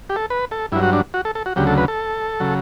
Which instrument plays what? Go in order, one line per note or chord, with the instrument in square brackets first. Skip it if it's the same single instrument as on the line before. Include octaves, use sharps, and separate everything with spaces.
[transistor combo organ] G4
A4
B4
A4
G2 E4
F#3
F#4
D4
F#4
A4
A4
F#4
D2 C#3 F#3 G4
A4
B4
A4
C#3 F#3